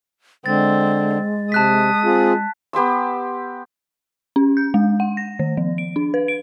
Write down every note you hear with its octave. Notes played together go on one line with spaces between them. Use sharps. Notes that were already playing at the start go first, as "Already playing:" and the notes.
D3 G#3 C4 A6
C3 A5 D#6 F#6 B6
C4 F4 G#4
B3 G4 C6 E6
C#4
G6
G#3
F#5
A#6
D#3
F3
D7
D4
B4
D7